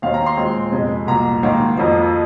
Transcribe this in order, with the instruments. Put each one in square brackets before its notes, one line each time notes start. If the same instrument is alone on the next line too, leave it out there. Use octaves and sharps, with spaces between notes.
[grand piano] D#2 D#3 C4 F5
A#5
C6
A#2 G#3 C4
F2 C3 G#3
C2 A#2 A#3 A#5
G#2 D#3 A#3
F2 F3 A#3